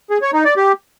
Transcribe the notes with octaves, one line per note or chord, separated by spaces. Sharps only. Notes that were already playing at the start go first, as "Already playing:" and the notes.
G#4
C#5
D#4
D5
G4